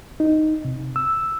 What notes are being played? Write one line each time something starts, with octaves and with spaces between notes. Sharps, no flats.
D#4
C3
E6